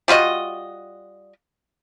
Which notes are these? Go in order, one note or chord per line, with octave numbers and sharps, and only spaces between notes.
G3 F4 F#4 D#5